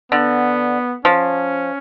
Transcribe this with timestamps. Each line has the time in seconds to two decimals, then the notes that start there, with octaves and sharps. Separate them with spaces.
0.12 D3 B3
1.05 F3 C#4